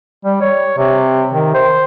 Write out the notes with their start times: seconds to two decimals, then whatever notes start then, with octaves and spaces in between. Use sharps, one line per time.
0.25 G3
0.41 C#5
0.77 C3
1.32 D#3
1.55 C5